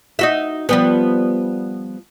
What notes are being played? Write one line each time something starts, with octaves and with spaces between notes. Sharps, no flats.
D#4 F#4 E5
F3 G3 B3